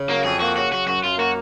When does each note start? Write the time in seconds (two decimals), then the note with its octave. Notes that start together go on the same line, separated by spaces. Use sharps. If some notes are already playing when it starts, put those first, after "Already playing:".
Already playing: C#3
0.09 F#3 A#3
0.24 F2 G#4
0.40 A#3 F#4
0.57 C#3 F#4
0.72 F#3 F#4
0.87 F#2 F#4
1.04 F#2 F4
1.18 A#3 F#4